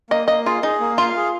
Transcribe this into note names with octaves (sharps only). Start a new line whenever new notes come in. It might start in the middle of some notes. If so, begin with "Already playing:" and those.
A#3 D#5
A#3 D#5
F4 G#4
D#4 G#4
A#3
F4 F5
G#4